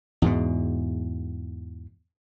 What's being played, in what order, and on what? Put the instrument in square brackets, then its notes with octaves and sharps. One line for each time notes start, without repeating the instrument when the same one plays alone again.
[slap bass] E2 G#2 B2